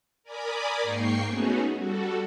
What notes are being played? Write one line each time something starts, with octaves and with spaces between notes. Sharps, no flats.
A#4 D5 G#5 B5 D6 D#6
G#2 A#3 G5 C#6 C7
A3 B3 C#4 D#4 F#4 G#4
G3 F#4 A4